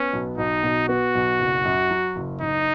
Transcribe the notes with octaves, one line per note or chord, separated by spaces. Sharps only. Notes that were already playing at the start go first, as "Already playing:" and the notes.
Already playing: B3 C#4
B1
B1 D#4
B2
B3 F#4
B1
F#1
F#2
F#3
F#1
F#1 D#4